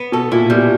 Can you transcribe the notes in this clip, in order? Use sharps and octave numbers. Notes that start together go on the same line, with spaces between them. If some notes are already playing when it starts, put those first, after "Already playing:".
Already playing: B3
B2 A4
A#2 E4
B2 G3